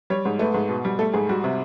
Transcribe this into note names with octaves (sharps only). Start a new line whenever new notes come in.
G3 C#5
G#2
A3 B4
G#2
B2
G3
A3 A4
G#2 G#4
G3 F#4
C3